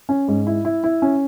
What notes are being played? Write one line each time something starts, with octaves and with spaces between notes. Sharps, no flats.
C#4
G#2
E4
E4
E4
C#4